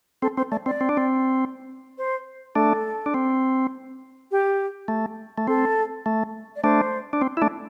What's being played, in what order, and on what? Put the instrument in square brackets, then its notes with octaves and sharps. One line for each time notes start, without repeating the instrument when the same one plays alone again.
[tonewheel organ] C4 [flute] A4
[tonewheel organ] C4 [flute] C5
[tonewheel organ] A3 [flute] D5
[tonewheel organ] C4 [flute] D5
[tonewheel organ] C4
D4
C4
[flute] C5
[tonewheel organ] A3 D4 [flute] A4
[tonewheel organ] D4
C4
[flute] G4
[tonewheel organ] A3
A3
[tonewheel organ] C4 [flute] A4
[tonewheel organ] A3
[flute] D5
[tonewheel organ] A3 D4 [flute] C5
[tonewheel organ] D4
C4
E4
A3 D4